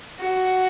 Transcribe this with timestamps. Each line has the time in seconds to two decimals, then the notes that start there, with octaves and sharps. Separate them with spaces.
0.20 F#4